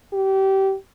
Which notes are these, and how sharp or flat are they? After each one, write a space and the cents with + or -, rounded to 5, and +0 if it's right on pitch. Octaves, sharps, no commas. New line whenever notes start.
G4 -25